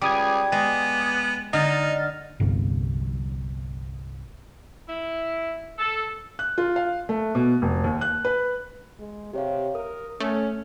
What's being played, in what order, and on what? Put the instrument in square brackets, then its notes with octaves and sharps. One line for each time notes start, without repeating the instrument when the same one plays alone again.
[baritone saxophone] C#2 [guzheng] G3 [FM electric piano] D6 D#6 G#6
[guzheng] G#3 [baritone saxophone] B3
[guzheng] D3 [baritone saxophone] D#4 [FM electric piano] D#5 F6 A6
[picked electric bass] G1 C2 G2
[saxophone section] E4
A4
[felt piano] F#6
F4
F5
A3
B2
F1
D#2
F#6
B4
[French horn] G#3
[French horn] C3 [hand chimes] G4 C#5 F5
[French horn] A#4 [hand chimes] D#6
[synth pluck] A3 [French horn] C#4